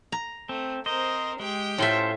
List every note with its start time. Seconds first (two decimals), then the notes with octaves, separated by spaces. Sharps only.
0.12 A#5
0.49 A3 C4
0.86 C4 A#4 C5 D#5
1.40 G#3 G4 G5
1.78 A2 C#4 F4 A4 C5 E5